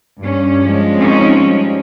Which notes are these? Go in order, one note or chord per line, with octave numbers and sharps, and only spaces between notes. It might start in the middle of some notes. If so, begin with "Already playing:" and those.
G2 C#4
F3 G#3
C4 C#4 D#4
G3